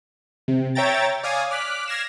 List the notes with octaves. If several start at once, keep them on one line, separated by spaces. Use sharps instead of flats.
C3
C#5 E5 G5 A#5 A6
C#5 D5 F5 G#5 D#6
D6 F6 F#6 B6
F6 G#6 A#6 C7 E7